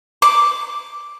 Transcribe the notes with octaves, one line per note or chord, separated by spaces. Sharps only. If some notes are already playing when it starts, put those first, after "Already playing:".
D6